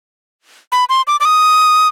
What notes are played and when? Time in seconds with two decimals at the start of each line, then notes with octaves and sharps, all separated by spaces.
0.72 B5
0.89 C6
1.07 D6
1.20 D6
1.25 D#6